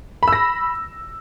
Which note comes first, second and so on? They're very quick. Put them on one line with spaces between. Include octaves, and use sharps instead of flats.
B5 E6 A#6